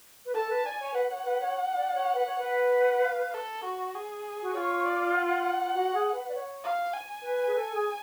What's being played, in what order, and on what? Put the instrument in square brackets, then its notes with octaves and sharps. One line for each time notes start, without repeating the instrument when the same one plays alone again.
[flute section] B4
[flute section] A4 [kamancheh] A5
[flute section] B4
[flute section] D5 [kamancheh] G#5
[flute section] C#5
[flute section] B4 [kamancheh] F#5
[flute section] C#5
B4
C#5
D5
C#5
B4
C#5
B4
[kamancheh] F#5
F5
A4
F#4
G#4
[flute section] F#4
[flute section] F4 [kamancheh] C#5
[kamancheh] D5
F#5
[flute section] F#4
G#4
B4
D5
C#5
[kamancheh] F5
G#5
[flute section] B4
G#4
A4
G#4